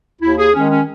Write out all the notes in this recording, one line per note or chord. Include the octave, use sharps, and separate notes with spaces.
D#2 E4
G#4
D#3 G#3 C#4
C#4